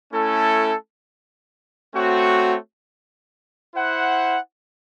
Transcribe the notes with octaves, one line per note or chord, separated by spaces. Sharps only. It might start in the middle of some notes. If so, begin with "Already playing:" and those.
A3 C#4 E4 A4
A3 C4 F#4 C#5
E4 C5 F#5